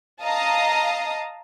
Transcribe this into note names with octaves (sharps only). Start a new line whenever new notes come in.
D#5 F5 A5 A#5 D#6